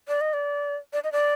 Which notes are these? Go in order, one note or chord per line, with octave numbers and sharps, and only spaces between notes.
D5
D#5
D5
D5
D#5
D5